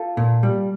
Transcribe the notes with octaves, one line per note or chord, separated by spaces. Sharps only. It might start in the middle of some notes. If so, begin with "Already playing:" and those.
Already playing: F4 A4
A#2
G3